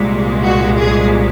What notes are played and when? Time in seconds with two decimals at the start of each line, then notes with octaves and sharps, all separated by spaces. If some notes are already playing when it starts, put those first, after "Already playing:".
Already playing: C2 A#2 G#3
0.43 F#4
0.79 G#4